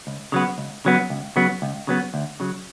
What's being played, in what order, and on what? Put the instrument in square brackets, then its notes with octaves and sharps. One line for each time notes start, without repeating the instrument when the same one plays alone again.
[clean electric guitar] C#2
C#3 F#3 B3
C#2
C#3 F#3 B3
C#2
C#3 F#3 B3
C#2
C#3 F#3 B3
D2
C#3 F#3